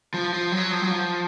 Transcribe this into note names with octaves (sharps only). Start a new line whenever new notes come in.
F3
F3
F#3
F3
F#3
F3